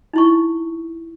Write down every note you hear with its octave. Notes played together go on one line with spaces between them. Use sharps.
D#4 E4 C#6